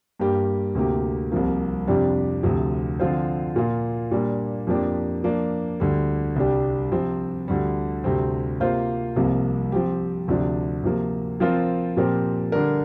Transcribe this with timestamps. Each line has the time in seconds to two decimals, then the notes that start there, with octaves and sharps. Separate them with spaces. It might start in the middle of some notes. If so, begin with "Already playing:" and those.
0.19 G2 G3 A#3 G4
0.75 D2 C3 A#3 G4
1.31 C2 C3 F3 A#3
1.87 F2 C3 G3 D4 G4
2.43 D2 C3 F3
3.00 D3 F3 C4 F4 C5
3.56 A#2 A#3 F4
4.11 A#2 G3 A#3 D4
4.67 F2 F3 A#3 D4 G4
5.24 F3 A#3 D4
5.80 D2 D3 G3
6.36 C2 C3 G3 D4 G4
6.92 C3 F3 C4
7.48 D2 D3 G3
8.04 D2 C3 G3 C4
8.60 C3 A#3 F4 C5
9.16 C2 C3 F3 A#3
9.72 F3 C4 G4
10.28 D2 C3 F3 D4
10.84 C3 F3 A#3
11.40 F3 C4 F4 A#4
11.97 A#2 F3 C4 G4 A#4
12.52 D3 G3 D4 A#4